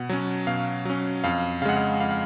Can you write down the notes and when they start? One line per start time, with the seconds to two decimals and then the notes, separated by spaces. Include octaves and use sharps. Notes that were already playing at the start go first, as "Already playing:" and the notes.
Already playing: B2 F#5
0.09 F#3 C#4
0.47 B2 F5
0.85 F#3 C#4
1.24 F2 F5
1.62 C#3 F5
1.65 G#3 F#5
1.77 F5
2.00 F2 F5
2.11 F5